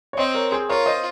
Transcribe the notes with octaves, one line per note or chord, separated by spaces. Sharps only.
C#5
C4 C5 D#5
A#4 C#5
G#4 C5
F4 A#4 C#5
C5 D#5